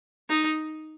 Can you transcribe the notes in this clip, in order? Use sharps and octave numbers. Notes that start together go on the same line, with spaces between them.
D#4